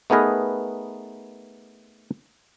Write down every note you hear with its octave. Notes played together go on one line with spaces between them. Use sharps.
A3 B3 D#4 G#4 A#4 B4